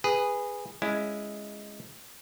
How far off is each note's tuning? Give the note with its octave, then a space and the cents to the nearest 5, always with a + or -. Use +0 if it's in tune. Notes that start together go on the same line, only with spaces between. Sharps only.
G#4 -15 B4 +0
G#3 +0 C#4 +0 E4 +10